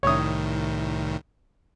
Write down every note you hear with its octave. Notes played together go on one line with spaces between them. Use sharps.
C2 A2 D#3 C#5 D#6